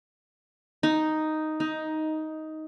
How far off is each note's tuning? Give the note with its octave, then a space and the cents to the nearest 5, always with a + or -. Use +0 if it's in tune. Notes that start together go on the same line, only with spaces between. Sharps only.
D#4 +0
D#4 +10